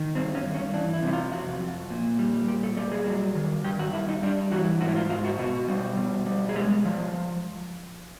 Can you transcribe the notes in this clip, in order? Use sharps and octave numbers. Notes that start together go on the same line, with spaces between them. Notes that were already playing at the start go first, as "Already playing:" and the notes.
Already playing: D#3
G2 C4
C#4
G2
C#4
E3 D4
E4
C3
E4
F4
F2 F#4
F2
A#2
G3
A#2 G4
A4
G3 A4
G#4
F#3
D#3
G2 G4
F#4
G2 E4
D#4
G3 D4
E3 F#4
G#2 F#4
E4
F4
G#2 F4
F#4
B2 F#4
G3
B2
G3
G#4
G#3 G4
F3